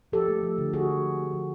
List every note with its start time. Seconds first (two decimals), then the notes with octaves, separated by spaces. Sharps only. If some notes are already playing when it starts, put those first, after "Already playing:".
0.12 F3 G4 A4
0.28 A3
0.43 F3
0.58 D3
0.73 D3 F#4 G#4
0.89 F3
1.03 F3
1.18 A3
1.33 F3